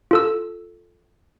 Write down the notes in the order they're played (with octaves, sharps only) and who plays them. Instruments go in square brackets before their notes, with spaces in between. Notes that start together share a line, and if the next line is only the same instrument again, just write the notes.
[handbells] F4 A4 E6